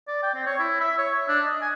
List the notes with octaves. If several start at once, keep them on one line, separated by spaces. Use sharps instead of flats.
D5
G5
C4
C#5
E4
E5
C#5
E5
D4
D#5
G#5